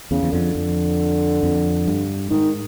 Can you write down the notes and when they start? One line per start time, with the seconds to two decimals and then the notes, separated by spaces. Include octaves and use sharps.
0.11 E2 C#3
0.23 E2
0.33 F2 D3
0.55 F2
1.43 F2
1.87 G2
2.31 G#2 D#3